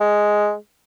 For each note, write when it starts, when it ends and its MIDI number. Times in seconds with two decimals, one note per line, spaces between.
0.01 0.54 56